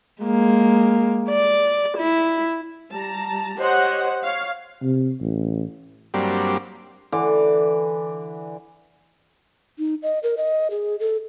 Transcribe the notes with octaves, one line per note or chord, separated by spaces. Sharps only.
G#3 A#3
D5
E4
G3 A5 A#5
G4 C5 C#5 D#5 F#5
C#5 F5
C3
A1
G2 F#3 G3 A#3 C4 D4
D3 E3 D6
D#4
D#5
A#4
D#5
G#4
A4